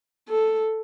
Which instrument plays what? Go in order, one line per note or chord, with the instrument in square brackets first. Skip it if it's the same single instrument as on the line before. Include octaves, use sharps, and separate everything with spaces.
[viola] A4